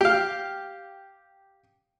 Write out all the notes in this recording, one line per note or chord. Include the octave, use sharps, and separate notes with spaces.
G4 F5